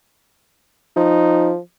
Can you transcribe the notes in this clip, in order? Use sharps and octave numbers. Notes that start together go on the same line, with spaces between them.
F3 D#4